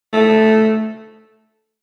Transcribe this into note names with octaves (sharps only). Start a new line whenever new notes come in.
A3